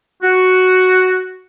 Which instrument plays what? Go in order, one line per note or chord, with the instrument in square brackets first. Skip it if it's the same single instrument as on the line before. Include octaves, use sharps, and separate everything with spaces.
[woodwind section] F#4